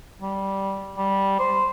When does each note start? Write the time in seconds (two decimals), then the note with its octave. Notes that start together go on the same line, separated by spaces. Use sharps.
0.21 G3
0.97 G3
1.39 C5